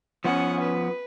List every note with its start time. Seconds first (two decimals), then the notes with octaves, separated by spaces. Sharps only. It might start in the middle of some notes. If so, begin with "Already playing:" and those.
0.24 F3 B3 C#4 F#5
0.61 B4